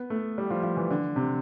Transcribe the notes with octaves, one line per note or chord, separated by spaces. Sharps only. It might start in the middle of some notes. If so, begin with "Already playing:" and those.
Already playing: B3
A3
G3
F3
F3
E3
D3
C3